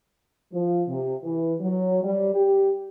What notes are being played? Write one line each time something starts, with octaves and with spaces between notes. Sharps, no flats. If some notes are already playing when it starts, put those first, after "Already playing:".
F3
C3
E3
F#3
G3
G4